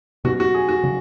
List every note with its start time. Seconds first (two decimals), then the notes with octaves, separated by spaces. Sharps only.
0.24 B2 F#3 C#4 F#4
0.40 F#4
0.54 G#4
0.69 F#4
0.84 C#3 F#3